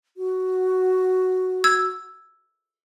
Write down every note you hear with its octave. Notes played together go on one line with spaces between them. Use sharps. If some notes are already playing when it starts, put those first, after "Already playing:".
F#4
E6 G#6